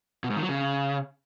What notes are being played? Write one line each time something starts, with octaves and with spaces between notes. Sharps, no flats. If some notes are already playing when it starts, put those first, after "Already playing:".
B2
G#2
D#3
F#3
C#3